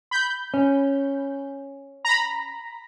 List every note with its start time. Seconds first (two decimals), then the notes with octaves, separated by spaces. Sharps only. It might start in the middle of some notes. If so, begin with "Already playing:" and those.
0.11 B5 G6
0.54 C#4
2.05 A#5 B5